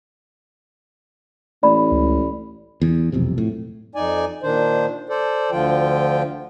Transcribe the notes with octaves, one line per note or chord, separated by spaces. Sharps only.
A1 D5 B5
C#2
E2
E1 B1 F2 C3
A2
F2 D#4 D5 G#5
A#2 D#3 D4 C5
A4 C5 D5
D2 D3 F3 F4 G5